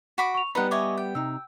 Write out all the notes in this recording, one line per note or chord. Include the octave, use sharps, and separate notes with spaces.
F#4 B5 D6
C#6 F7
G3 B3 D#4 B4 F#5 B5
C#5 D#5 E5 G#5 D6
G5
C3 D#4 E6